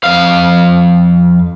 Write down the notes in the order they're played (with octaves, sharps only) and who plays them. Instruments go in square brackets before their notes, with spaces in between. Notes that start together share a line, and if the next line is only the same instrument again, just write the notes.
[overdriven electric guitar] F2 F5